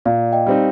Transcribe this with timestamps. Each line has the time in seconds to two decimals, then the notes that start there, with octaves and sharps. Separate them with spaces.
0.06 A#2 D5 F5
0.32 D#5 G5
0.47 G3 C4 D#4